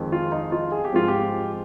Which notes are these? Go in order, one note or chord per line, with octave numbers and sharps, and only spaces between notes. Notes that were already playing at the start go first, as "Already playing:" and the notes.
Already playing: F2 D#3 G#3 C4
F4
D#4
F4
G#4
G4
G#2 F3 G#3 C4 F4
G4